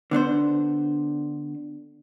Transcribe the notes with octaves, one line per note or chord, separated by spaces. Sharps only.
D3 B3 D4 C5